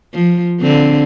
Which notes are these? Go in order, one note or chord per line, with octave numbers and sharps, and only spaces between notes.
F3
D3 C4